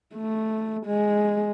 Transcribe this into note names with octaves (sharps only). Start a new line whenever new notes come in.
A3
G#3